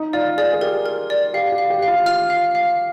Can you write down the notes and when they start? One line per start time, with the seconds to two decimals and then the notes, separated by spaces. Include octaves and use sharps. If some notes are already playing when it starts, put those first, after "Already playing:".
Already playing: D#4
0.13 F4 D5
0.38 G#4 D5
0.53 G#4
0.61 G4 A#4
0.86 A#4
1.10 D5
1.34 G4 F5
1.52 G4
1.58 F5
1.70 G4
1.82 F5
1.88 F4
2.06 F4 F6
2.30 F5
2.55 F5